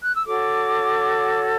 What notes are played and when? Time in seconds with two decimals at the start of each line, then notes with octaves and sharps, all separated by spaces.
0.04 F#6
0.15 E6
0.26 F#4 A4 C#5 D6